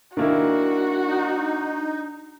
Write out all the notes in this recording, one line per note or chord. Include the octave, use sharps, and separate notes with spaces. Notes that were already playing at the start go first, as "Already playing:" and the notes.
D#3 A#3 D4 E4 F#4
D#4